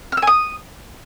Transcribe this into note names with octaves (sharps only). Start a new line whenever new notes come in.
F6
E6
G#5
D#6